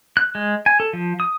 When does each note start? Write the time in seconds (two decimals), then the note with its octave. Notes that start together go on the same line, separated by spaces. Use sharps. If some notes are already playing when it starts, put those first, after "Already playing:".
0.17 F#6
0.35 G#3
0.66 G#5
0.80 A4
0.93 F3
1.20 D#6